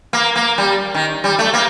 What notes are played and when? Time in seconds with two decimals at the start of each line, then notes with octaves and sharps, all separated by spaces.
0.13 A#3
0.36 A#3
0.58 G3
0.94 D#3
1.24 G3
1.39 A3
1.53 A#3